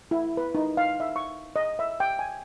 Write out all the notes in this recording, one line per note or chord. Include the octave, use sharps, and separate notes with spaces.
E4
B4
D#4
F5
E5
C#6
D#5
E5
G5
G#5